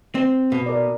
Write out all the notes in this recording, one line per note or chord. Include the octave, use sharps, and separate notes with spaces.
C4
B2
A#4 D5